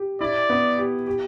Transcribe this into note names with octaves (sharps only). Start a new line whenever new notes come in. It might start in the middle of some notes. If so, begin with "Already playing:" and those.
Already playing: G4
E4 D5
B3
G4
G4